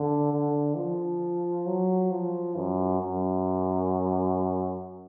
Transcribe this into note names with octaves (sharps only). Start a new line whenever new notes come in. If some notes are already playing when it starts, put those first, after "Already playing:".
Already playing: D3
D3
F3
F#3
F3
F#2
F#2